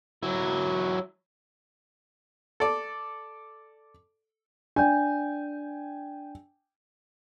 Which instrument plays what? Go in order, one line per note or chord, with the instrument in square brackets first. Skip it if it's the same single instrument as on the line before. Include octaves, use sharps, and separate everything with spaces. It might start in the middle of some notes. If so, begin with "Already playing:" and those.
[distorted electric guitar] F#3 E4
[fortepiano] A4 D5
[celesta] D4 D5 G6 [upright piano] G5 G#5